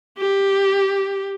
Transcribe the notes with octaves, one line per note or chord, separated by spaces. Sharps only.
G4